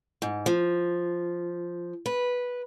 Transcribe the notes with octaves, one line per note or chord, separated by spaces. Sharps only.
G#2
F3
B4